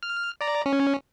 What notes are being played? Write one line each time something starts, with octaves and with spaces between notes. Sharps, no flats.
F6
D5 A#5
C#4